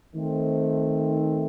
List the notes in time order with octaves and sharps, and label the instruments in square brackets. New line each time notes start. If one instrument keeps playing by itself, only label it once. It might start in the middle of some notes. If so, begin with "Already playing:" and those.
[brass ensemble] D#3 A3 C4